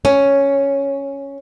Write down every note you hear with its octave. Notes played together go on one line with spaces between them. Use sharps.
C#4